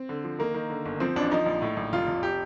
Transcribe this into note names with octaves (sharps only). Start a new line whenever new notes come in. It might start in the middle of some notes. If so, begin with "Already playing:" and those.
Already playing: C4
D3
F3
D#3 A#3
D#3
D3
G1
F3 C4
A1 D4
F3 D#4
A#1
A2
A#1
F1 F4
F1
G4